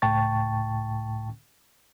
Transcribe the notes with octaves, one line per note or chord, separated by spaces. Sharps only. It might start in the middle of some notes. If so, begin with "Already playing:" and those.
C#2 A2 G5 A5 C#6 A6